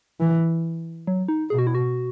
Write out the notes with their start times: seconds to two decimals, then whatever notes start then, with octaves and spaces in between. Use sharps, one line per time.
0.20 E3
1.07 F#3
1.28 D#4
1.50 B2 G#4
1.58 F#4
1.67 E4
1.75 F#4